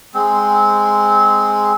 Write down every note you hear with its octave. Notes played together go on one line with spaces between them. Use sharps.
G#3 C4